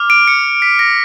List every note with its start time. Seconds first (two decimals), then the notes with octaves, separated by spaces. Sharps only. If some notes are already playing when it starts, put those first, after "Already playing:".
Already playing: D6 F6
0.10 D7
0.28 C#7
0.62 B6
0.79 A#6